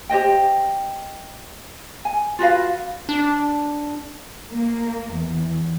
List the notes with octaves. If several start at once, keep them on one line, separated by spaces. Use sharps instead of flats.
G4 C5 D#5 G5
G#5
F4 F#4 B4 F5
D4
A#3
E2